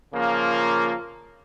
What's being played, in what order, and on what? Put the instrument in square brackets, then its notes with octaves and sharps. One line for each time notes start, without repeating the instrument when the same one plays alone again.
[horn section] C#3 F3 A#3 F4